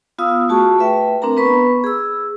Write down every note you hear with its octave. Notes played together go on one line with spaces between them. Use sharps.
B3 F4 F5 D#6 E6
A3 F4 F#4 G#4 A5 C#6
A3 B4 E5 G5
C4 D4 A#4 A#5
B3 B4 B5 C#6
G#4 E6